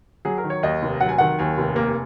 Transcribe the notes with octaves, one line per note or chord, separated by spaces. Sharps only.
F#3 G#4
A#4
D#3
C#5
D#2 D#5
F1
F#3 F#5
G#5
D#3 F#5
D#2 G#5
F1
A#3